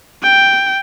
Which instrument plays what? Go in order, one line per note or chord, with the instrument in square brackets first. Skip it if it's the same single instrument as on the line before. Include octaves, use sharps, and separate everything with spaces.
[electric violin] G5